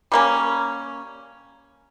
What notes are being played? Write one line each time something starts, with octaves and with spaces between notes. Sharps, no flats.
G3 A#3 C#4